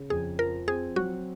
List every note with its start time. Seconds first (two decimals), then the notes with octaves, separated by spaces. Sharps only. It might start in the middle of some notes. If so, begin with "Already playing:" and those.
Already playing: C#3
0.10 F2 G#4
0.39 F3 A#4
0.68 C4 G#4
0.96 F#3 F#4